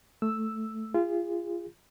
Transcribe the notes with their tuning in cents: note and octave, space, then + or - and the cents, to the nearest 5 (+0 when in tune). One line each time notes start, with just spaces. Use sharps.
A3 +0 E6 +0
F4 -25 G#4 -30